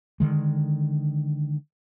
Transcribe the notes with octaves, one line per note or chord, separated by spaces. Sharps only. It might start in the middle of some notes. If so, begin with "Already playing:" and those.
D3 D#3 G#3